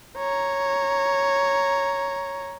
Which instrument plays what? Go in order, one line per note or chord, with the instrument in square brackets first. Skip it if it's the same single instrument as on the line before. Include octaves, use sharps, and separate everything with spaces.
[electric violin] C#5 A#5